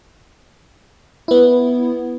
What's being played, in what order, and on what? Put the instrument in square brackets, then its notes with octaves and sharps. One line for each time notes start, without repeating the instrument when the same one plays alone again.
[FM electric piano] B3 E4